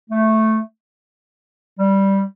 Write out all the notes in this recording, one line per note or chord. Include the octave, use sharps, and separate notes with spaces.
A3
G3